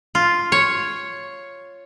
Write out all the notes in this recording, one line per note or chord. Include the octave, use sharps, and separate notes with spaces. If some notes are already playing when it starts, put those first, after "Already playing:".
F4
C#5